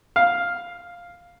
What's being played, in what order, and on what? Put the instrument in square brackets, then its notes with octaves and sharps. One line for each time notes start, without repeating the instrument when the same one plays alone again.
[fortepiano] F5